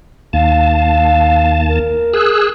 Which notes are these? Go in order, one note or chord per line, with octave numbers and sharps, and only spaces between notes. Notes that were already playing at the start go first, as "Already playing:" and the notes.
D#2 F5 A5
A#4
G#4 E6 F#6